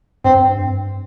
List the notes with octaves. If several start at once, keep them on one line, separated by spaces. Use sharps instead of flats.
G2 C4